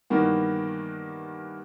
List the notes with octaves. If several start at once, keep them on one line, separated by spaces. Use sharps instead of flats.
G2 D#3 E3 A#3 B3